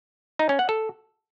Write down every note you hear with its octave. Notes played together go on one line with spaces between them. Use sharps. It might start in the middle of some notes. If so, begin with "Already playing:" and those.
D#4
C#4
F#5
A4